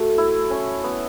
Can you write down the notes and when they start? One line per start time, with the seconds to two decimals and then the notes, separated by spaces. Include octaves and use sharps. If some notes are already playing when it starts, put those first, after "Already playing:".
Already playing: A3 F#4
0.18 E4
0.50 C#4
0.84 B3